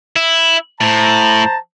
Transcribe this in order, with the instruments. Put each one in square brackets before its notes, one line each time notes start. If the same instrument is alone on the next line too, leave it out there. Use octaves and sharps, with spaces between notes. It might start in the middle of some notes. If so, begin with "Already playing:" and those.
[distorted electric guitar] E4
[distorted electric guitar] A2 [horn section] C5 A5 A#5